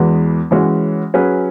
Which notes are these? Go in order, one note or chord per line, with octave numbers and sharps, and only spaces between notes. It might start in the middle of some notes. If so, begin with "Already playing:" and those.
Already playing: E2 E3 G#3 B3 F#4
E3 G#3 C#4 F#4 C#5
F#3 C#4 G#4 B4